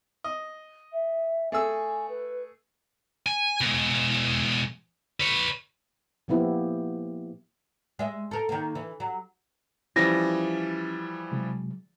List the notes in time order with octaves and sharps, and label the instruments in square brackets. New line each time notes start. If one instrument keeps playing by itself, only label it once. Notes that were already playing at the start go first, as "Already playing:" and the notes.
[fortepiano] D#5
[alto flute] E5
[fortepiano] A3 G#4 E6 [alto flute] G#5
[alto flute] B4
[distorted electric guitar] G#5
B2 G#3
B4 C#5
[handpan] A#2 F3 A#3 B3 E4 G4
[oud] G#3 E5
A4 A#4
D#3 A#3
E3
F#3
[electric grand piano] E3 F3 G3 [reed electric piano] C#4 [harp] A#6
[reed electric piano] C3 F#3 G#3